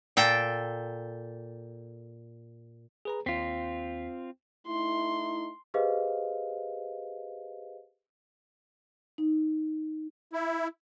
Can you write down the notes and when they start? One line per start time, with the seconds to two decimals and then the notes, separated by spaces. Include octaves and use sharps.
0.17 A#2 A4 G5
3.05 G#4 B4 A#5
3.26 D#2 C4 F4 B6 C7
4.67 A3 D#4 E4 C6
5.74 G4 G#4 B4 C5 D#5 F5
9.18 D#4
10.33 E4